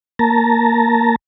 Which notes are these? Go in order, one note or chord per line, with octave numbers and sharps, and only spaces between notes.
A#3 A5 A#5